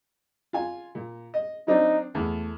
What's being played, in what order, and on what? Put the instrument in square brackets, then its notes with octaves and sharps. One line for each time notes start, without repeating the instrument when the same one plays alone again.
[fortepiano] F4 G#5
A#2
D#5
[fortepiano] F#3 C4 D4 [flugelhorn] D#4
[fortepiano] E2 [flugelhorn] A3